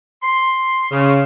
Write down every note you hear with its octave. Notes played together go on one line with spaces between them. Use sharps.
C6
C#3